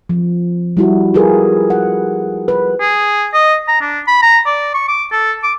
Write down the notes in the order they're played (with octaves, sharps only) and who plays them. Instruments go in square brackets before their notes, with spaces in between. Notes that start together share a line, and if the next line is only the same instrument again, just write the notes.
[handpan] F3
G3 E4 F#4
F4 G4 G#4 A#4 B4
F#5
B4
[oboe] G#4
D#5
A#5
D4
B5
A#5
D5
C#6
D6
A4
D6